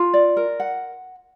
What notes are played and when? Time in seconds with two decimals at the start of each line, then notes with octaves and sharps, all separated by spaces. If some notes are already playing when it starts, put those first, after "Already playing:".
Already playing: F4
0.14 D5
0.37 A#4
0.60 F#5